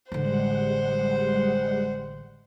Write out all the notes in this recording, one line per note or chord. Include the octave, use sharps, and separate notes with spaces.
A1 D3 G3 G#3 C5 F#5